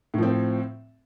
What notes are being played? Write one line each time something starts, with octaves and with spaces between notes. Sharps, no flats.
A2 F3 C4